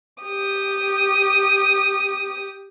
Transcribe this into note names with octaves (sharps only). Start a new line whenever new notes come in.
G4 D#6